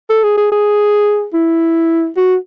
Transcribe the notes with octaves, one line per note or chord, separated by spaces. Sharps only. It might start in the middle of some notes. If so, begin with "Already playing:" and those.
A4
G#4
G#4
G#4
E4
F#4